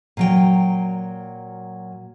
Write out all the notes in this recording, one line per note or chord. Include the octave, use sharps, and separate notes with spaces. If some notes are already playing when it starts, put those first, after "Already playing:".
A#2 F#3 G5